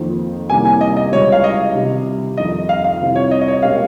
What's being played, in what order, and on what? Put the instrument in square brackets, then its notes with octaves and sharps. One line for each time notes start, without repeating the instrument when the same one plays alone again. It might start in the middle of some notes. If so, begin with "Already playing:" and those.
Already playing: [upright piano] F2 D#3 A#3 F4 C5
[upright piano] C2 C3 D#3 A#3 C#4 [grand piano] G#5
[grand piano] G#5
D#5
D#5
[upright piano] C#2 C#3 G3 [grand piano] C#5
[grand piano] F5
D#5
[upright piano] C3 D#3 G3
[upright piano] F2 D#3 G3 [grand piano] D#5
[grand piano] F5
F5
[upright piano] C2 C3 G3 C4 F4
[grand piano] C#5
D#5
D#5
C#5
[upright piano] A#2 G#3 C#4 G4 A#4 [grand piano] F5